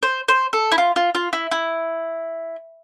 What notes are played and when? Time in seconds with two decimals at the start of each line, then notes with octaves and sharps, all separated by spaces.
0.03 C5
0.28 C5
0.53 A4
0.72 E4
0.78 F4
0.96 F4
1.15 F4
1.33 E4
1.51 E4